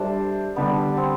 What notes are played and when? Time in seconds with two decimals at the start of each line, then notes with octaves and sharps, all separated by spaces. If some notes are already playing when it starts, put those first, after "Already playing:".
Already playing: G3 D4 A4 C5 E5
0.56 D3 G3 B3 D4 G4
0.97 C4